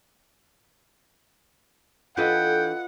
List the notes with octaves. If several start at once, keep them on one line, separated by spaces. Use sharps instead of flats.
E3 D4 F4 A4 B4 D#5 F#5 G5